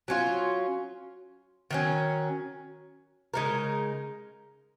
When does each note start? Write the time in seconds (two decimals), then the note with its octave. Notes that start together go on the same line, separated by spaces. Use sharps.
0.08 F#3 C#4 F4
1.71 D#3 F#3 C#4
3.34 C#3 G#3 D#4 A#4